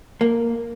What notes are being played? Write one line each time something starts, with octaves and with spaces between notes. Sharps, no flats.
A#3